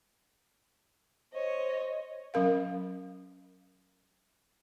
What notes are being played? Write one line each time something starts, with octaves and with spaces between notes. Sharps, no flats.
C5 C#5 D#5
F#3 C#4 A#4 F5